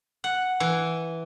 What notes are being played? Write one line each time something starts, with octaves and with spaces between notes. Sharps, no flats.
F#5
E3